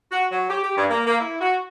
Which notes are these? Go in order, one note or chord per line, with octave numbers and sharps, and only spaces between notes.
F#4
F#3
G4
G4
G2
A#3
A#3
E4
F#4